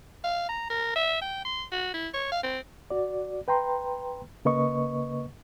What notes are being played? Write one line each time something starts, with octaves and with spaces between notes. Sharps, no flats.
F5
A#5
A#4
E5
G5
C6
F#4
E4
C#5
F5
C4
F#4 D5
B4 G5 A#5 C6
C#3 A#3 B4 D#5 C#6